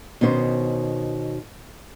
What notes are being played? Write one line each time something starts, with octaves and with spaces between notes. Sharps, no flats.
B2 D#3 C#4 C5